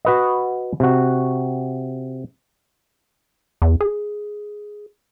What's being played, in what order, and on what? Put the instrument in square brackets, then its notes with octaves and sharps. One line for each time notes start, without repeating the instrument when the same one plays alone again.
[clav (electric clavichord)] F#4 B4 D#5
C3 F#4
[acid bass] E2
G#4